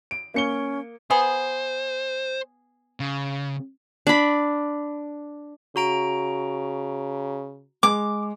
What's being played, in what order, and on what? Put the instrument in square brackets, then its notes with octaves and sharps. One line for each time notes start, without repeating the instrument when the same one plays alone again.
[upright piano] D7
[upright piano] A#3 C#7 G7 [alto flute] C#4
[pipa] B3 G#4 [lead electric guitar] C5
[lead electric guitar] C#3
[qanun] D4 B5
[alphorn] C#3 [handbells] F#4 A#5 D7
[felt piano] G#3 [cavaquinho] D6